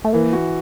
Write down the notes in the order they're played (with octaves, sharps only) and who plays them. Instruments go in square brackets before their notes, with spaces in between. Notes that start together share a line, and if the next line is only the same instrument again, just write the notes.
[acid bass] A3
[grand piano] E3 [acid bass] A#3
[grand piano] F#4